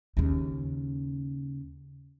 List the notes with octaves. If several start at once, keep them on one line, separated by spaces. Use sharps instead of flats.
D#2 C#3